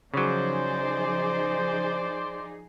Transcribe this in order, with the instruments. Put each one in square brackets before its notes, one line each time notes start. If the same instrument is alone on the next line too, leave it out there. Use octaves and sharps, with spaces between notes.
[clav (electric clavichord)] C#3 F#3 [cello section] F3 D#4 G#4 [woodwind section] C5 D5